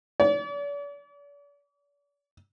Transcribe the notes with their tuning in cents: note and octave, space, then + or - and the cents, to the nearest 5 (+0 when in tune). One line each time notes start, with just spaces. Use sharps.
D5 -45